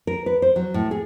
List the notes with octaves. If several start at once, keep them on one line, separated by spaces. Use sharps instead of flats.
A#4
B4
C5
F#3
A2
G#4